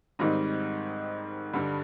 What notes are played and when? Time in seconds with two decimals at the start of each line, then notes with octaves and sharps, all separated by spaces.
0.19 G#2 D#3 G3 C4 D#4
1.53 G2 D3 G3